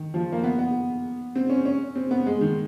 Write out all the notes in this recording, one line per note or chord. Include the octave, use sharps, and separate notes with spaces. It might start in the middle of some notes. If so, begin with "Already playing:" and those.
Already playing: D#3
F3
A#3
B3
B3
C4
C#4
C#4
C4
B3
G#3
D#3